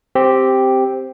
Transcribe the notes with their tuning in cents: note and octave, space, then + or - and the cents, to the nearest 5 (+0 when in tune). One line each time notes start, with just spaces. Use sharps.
C4 +0 G4 +0